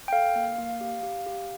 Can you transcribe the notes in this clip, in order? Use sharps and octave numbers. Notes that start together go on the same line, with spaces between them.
G5
A4 F5
A#3
A#3
G4
G4
G4